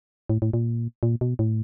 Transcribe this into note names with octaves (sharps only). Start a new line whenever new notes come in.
A2
A2
A#2
A#2
B2
A2